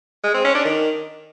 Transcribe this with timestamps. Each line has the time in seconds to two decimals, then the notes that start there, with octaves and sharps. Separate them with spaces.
0.24 G#3
0.34 C4
0.44 C#4
0.55 D4
0.65 D#3